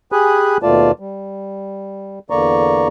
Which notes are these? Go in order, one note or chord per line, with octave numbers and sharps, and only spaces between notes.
G4 G#4 G#5 B5 D#6 F#6
D#2 B2 A3 F4 D5 A5
G3
E2 D3 A#3 D5 A#5 C#6